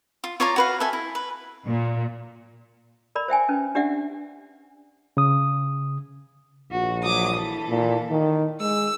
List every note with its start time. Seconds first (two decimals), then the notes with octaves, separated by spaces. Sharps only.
0.24 F4
0.40 F4 C#5 D5 A#5
0.56 F#4 B4 F5
0.80 A4 E5 G#5
0.93 E4
1.15 B4
1.67 A#2
3.15 A#4 D5 B5
3.28 C5 E5 G5 G#5
3.49 C#4 D#4 B4
3.75 D4 G4 D5 E5 F#5
5.17 C#3 D#6
6.71 A#1 F#4
7.04 F#3 D6 D#6
7.36 E3 A4
7.69 A#2
8.10 D#3
8.60 G#3 E6